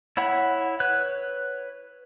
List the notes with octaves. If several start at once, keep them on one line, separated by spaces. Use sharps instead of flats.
E4 C#5 F#5 B5
B4 C#5 F#6